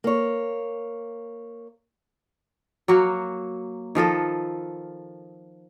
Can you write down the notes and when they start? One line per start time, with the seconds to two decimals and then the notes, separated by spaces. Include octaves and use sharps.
0.04 A#3 C#5
2.88 F#3 A#3 F#4
3.95 D#3 F3 A4 D#5